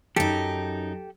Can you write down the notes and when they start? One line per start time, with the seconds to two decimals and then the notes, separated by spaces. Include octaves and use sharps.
0.16 F#2 D#4 G4 A4